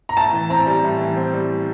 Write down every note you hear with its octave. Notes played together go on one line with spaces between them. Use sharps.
A#5
A2 A5
E3
C4 A#5
G3
A2
E3
C4
G3